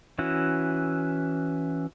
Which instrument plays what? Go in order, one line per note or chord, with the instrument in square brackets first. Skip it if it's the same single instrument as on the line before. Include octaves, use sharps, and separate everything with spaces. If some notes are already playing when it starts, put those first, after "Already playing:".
[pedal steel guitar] E3 C#4 E4 F#4